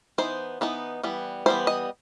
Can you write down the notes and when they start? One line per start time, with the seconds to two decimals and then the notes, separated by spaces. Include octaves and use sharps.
0.18 E3 B3 D#4 C5
0.61 E3 B3 D#4
1.03 E3 G3 B3
1.46 E3 G3 B3 C5
1.67 D#5